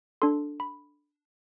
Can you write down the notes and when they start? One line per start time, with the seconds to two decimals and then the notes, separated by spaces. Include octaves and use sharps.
0.22 D4 A4 C6
0.60 B5